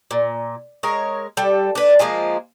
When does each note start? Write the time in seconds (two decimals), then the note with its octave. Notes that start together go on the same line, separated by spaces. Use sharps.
0.11 A#2
0.83 G#3 A#4 C#5
1.37 G3 A4
1.75 D4 B4
1.99 F3 G#3 A#3 F4